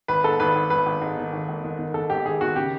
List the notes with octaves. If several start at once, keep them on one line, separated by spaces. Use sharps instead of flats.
G#1 B4
G#2 A4
G#1 B4
G#1
G#1 B4
G#1
G#2
D#3
G#1
G#1
D#3
D#3
D#3 A4
G#1 G4
G#1 G#4
D#3 F#4
C#3 G4